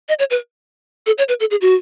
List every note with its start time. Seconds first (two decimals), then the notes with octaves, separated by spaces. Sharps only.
0.09 D#5
0.19 C#5
0.30 B4
1.06 A4
1.18 C#5
1.29 B4
1.40 A4
1.51 G#4
1.61 F#4